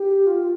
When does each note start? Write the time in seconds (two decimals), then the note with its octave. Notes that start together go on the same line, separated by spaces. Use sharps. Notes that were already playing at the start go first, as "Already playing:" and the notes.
Already playing: G4
0.27 F4